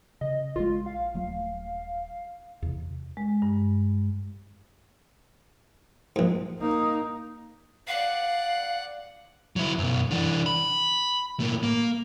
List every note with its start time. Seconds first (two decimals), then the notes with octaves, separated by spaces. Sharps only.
0.21 C#3 D#5
0.56 A#1 G#3 F4
0.86 F5
1.14 D#1 F#3 A3
2.62 E2 C3
3.17 G#3
3.42 G2
6.16 A#1 G#2
6.58 A#3 D#4
7.88 D5 F5 F#5
9.56 F#3 E4
9.78 F#2 B2
10.11 E3 D4
10.46 B5
11.40 A2 A#3
11.63 A#3